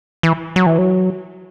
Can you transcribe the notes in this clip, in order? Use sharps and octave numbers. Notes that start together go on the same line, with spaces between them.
E3
F#3
E3
F#3